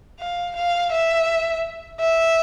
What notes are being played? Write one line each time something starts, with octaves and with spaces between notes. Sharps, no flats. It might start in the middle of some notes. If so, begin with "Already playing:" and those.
F5
F5
E5
E5